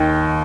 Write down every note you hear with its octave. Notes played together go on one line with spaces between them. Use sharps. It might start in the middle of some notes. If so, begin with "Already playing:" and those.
Already playing: D#2 D#3 G5